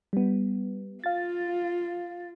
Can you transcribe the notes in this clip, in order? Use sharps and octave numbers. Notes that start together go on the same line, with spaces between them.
G3 B3
F4 F5 A6